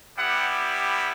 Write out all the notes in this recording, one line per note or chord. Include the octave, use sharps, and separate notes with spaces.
G3 B3 E4 G4 F#5